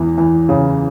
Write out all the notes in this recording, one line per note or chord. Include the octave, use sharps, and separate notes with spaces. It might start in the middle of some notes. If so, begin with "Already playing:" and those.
Already playing: E2 E3
E3
C#3